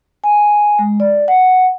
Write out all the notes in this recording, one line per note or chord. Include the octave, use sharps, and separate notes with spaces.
G#5
G#3
D5
F#5